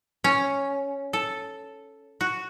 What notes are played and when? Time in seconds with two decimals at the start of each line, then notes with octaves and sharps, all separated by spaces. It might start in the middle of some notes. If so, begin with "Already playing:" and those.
0.24 C#4
1.13 A4
2.21 F#4